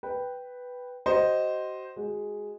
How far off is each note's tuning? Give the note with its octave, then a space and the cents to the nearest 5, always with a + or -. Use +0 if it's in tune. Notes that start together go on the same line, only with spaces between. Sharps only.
B4 +0 G5 +0
F#4 +40 C5 +0 D#5 +0
G#3 +0 F#4 +0